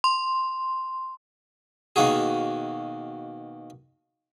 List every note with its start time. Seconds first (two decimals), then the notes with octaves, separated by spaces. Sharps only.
0.04 C6
1.96 B2 D#3 A#3 F#4 G#4